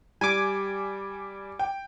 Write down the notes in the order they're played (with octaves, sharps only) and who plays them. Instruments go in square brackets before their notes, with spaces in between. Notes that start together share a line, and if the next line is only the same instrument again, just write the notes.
[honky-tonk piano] G3 [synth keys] G#5 D6
[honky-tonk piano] G5